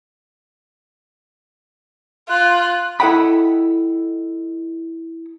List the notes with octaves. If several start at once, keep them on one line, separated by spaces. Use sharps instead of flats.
F4 F#6
E4 A4 D#5 F#5 G5 B5